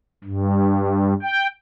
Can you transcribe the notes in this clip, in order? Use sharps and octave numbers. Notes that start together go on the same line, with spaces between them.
G2
G5